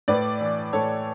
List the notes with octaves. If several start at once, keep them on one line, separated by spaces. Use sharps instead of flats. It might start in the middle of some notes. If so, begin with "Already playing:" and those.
A2 B4 D5
E3
A2 A4 C#5